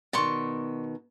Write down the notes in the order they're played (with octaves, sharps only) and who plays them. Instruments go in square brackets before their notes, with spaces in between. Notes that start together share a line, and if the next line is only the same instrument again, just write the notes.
[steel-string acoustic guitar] B2 D#3 [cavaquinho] D5 C6 C#6